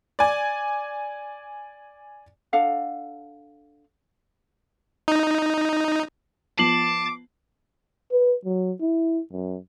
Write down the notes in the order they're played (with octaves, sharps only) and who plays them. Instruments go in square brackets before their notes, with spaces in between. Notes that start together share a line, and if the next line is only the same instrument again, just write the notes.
[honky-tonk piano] D5 G#5
[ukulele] D4 A4 F5 F#5
[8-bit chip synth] D#4
[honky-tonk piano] F3 B3 F#7 [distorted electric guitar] A5 [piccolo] D6 [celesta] C7
[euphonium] B4
F#3
E4
F#2